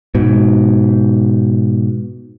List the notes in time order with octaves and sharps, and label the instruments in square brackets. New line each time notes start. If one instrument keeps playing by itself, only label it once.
[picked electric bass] G#2 B2